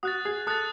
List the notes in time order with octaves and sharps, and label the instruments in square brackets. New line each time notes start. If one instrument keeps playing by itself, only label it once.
[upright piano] F#4 [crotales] D#6 F#6 A6
[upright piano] G#4
[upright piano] A4 [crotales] D#6 F#6 A6